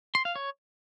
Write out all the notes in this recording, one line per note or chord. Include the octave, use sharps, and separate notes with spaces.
C6
F5
C#5